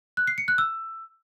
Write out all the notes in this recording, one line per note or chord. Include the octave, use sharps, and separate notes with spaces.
F#6
C7
C#7
F#6
E6